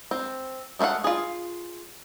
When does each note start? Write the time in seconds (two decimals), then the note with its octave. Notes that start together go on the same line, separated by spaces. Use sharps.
0.11 C4
0.79 G#3 A3 C5 F5 F#5
1.04 F4 G#4